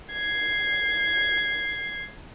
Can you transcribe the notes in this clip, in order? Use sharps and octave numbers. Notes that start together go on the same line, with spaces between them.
G#6 C7